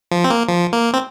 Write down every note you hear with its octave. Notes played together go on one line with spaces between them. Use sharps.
F3
C4
A#3
F3
A#3
C4